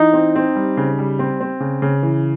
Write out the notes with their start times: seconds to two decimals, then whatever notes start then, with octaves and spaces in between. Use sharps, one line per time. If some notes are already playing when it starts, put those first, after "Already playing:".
Already playing: E3 D#4
0.13 C4
0.36 C4
0.55 G3
0.77 C#3
0.99 G3
1.19 C4
1.41 C4
1.60 C#3
1.82 C#3
2.03 E3